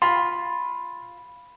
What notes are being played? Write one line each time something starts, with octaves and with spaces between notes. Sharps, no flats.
F4 B5 C6